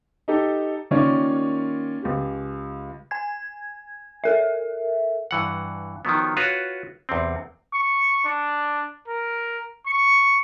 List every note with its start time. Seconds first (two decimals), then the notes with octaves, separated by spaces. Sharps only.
0.28 D#4 G4 A4
0.91 D#3 A#3 C#4 F4 C#5 D5
2.02 C#2 G4
3.11 G#5 G#6
4.24 A4 A#4 E5
5.31 G2 E3 F#5
6.05 D#3 F3 F#3 B3
6.37 F4 F#4 B4 C#5
7.09 E2 C3 C4
7.74 C#6
8.25 D4
9.08 A#4
9.87 C#6